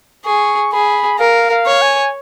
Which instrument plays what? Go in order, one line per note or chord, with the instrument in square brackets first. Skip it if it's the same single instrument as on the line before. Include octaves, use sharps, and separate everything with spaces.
[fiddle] G#4 [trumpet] C#6
[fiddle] G#4 [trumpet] B5
[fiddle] A#4 [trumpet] F5
[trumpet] F5
[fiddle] C#5
[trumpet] G#5